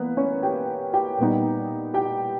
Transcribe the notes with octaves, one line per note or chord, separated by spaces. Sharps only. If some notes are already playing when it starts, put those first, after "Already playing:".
Already playing: E3 A#3 B3 A#4 B4
C#4 C#5
G4 G5
G4 G5
A#2 G3 B3 D#4
G4 G5